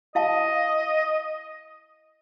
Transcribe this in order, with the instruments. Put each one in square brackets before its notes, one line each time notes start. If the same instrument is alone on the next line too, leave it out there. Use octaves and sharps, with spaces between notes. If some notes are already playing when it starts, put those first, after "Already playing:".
[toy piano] E4 F5 A5 [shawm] D#5